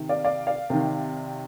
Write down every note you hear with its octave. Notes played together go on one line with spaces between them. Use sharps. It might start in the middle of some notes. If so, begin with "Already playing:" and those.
Already playing: C3 D#3
D5 F5
D5 F5
D5 F5
C3 D#3